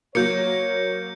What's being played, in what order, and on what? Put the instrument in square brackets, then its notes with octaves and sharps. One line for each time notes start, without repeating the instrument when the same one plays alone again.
[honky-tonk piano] F#3 A#3 [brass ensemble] C#5 [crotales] G6 C#7